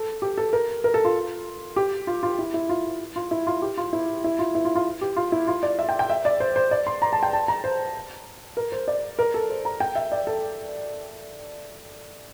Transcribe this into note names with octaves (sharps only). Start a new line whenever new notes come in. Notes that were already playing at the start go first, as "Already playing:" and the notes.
Already playing: A4
G4
A4
A#4
A#4
A4
F4
G4
F4
F4
E4
E4
F4
F4
E4
F4
G4
F4
E4
E4
F4
E4
F4
F4
G4
F4
E4
F4
D5
E5
G5
G5
E5
D5
C5
C5
D5
C6
A#5
A5
G5
A5
A#5
C5
A#4
C5
D5
A#4
A4
C5
A#5
G5
E5
D5
A4